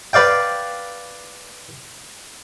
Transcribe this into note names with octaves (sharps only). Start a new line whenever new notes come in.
B4 D5 F5 G5